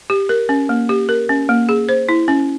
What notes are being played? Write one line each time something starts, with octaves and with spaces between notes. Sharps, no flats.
G4
A#4
C#4
A#3
G4
A#4
C#4
A#3
G#4
C5
E4
C#4